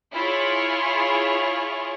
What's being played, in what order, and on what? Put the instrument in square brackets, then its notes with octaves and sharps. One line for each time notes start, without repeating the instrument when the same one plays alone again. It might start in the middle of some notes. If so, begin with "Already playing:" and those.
[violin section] E4 F4 G#4 C#5